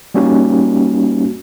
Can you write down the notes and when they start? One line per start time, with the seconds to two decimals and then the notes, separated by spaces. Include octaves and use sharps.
0.14 G3 A#3 C#4 D#4 F#4 G4